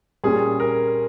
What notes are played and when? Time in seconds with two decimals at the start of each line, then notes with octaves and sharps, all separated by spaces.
0.24 A#2 G3 C#4 G#4
0.60 A#4